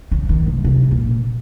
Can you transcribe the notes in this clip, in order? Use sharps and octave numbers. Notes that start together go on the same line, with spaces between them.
C#3
D#3
C3
C3
A#2